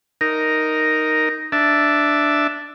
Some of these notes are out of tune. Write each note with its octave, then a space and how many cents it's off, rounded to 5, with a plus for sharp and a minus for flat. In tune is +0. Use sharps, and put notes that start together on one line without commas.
D#4 +0 A#4 +0
D4 +0 E5 +0 A5 +0